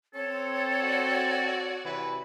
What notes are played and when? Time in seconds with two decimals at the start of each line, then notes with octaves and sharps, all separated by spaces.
0.15 C4 A4 C#5
0.79 F#4 D5
1.85 C3 E3 B4